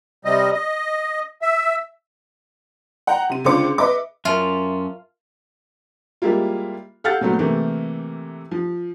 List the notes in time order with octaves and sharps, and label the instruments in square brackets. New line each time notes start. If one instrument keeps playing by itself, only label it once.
[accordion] C3 G3 D#5
D#5
E5
[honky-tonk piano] F#5 G5 A#5
C3 D#7
C#2 D3 F4 C5 D6 C#7
B4 D#5 E5 D6
[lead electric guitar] F#2 C#4 [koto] F4 [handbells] A#4 A5 C6 [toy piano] E5
[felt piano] G3 G#3 A#3 E4 F4
A4 F5 F#5 F6 G6 A6
A#2 F#3 A3 B3
C3 E3 A3 A#3
F3